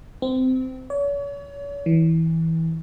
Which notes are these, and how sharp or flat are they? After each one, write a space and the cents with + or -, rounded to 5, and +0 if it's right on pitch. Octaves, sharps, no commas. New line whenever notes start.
C4 -20
C#5 +40
E3 -20